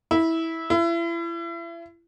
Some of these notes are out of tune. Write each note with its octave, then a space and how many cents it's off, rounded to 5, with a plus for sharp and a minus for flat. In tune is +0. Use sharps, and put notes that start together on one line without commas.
E4 -15
E4 +35